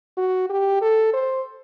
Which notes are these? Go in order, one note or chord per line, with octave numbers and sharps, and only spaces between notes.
F#4
G4
A4
C5